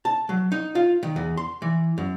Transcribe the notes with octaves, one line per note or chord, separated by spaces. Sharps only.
A5
F#3
D#4
F4
D#3
E2
C6
E3
F#2